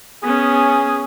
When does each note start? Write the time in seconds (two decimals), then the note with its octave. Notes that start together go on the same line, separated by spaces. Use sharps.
0.23 B3 C#4 G#4